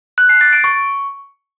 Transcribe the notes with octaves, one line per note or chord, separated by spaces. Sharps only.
F#6
C7
A6
D7
C#6